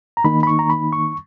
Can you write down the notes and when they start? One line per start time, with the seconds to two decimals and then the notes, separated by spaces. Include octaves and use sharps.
0.17 A#5
0.24 D#3 A#3 D#4 B5
0.43 B5
0.47 C#6
0.59 A#5
0.70 B5
0.93 C#6